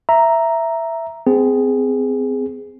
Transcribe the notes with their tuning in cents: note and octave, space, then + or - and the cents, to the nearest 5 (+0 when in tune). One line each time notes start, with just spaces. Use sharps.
E5 +5 A#5 +0
C4 -30 G#4 +0